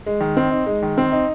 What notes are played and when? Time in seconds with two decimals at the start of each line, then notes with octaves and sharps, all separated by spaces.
0.06 G#3
0.20 D#3
0.37 C4
0.51 D#4
0.66 G#3
0.83 D#3
0.98 C4
1.12 D#4